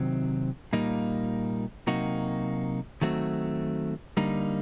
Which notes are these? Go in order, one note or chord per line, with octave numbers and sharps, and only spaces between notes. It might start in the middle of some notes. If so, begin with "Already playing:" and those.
Already playing: C3 D#3 F#3 C4
A#2 G3 A#3 D#4
C3 F#3 A#3 D#4 F#4
D#3 F#3 A3 C4 F#4
D3 G3 A#3 D#4